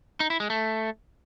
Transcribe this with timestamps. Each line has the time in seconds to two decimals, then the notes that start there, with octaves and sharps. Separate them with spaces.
0.20 D#4
0.30 E4
0.40 G#3
0.50 A3